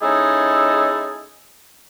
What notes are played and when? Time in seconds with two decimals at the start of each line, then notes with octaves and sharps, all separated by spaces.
0.02 G#3 C#4 D#4 E4 G#4 A4